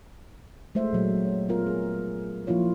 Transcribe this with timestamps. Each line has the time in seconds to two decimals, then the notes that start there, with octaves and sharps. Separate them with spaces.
0.75 G#3 A3 C5 E5
0.93 A#2 F#3
1.25 C#5
1.49 B3 F4 A#4
1.67 G#4
2.47 F3 A#3 E4 F4 C#5